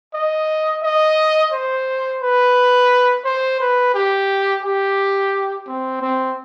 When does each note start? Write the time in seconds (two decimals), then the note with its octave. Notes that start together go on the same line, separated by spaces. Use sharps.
0.14 D#5
0.83 D#5
1.52 C5
2.21 B4
3.25 C5
3.60 B4
3.95 G4
4.63 G4
5.67 C4
6.01 C4